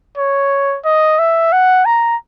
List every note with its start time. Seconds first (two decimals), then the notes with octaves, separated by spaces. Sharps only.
0.18 C#5
0.85 D#5
1.19 E5
1.52 F#5
1.86 A#5